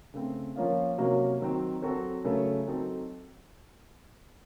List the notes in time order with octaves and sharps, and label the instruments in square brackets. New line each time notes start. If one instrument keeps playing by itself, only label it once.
[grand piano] C#3 A3 C4
F3 A#3 C#4 F4
C3 F#3 A#3 C#4 F#4
D#3 F#3 C4
F#3 C4 F#4 A4
C#3 F#3 A3 C#4 A4
F#3 C4 D#4 A4